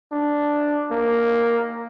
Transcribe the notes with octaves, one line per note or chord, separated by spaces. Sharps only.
D4
A#3